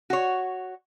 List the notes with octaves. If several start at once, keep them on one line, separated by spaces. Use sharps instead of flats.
F#4 C#5